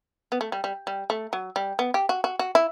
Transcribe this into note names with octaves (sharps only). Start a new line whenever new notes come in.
B3
A3
G3
G3
G3
A3
F#3
G3
B3
G4
F#4
F#4
F#4
E4